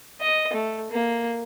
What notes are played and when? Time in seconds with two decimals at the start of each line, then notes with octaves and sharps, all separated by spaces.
0.21 D#5
0.53 A3
0.91 A#3